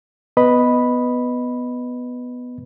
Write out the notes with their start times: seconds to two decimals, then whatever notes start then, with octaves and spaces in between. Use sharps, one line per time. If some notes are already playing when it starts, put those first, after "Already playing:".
0.37 B3 B4 D#5 B5